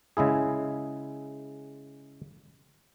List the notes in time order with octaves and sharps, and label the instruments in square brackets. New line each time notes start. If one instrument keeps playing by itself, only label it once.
[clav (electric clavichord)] C#3 G#3 E4 G#4